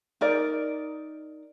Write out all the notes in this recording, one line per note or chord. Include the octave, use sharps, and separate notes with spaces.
D#4 A#4 D5